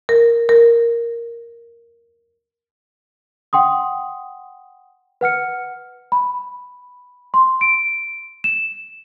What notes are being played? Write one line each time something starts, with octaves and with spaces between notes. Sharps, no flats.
A#4
A#4
F#5 G5 C6 D#6
B4 F#5 F6 C#7
B5
C6
D7
E7